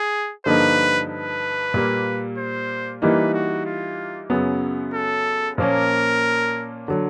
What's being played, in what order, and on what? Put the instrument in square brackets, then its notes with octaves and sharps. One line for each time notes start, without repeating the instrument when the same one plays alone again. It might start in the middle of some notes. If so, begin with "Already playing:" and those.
Already playing: [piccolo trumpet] G#4
[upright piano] G2 D3 F3 A#3 D#4 [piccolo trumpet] B4
[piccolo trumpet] B4
[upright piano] A#2 G3 A#3
[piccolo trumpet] C5
[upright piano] E3 G3 A#3 D#4 [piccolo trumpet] B4
[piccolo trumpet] F#4
F4
[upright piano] F#2 C#3 F#3 B3
[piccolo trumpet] A4
[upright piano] A#2 F3 A#3 C#4 [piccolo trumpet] A#4
[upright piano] D3 F#3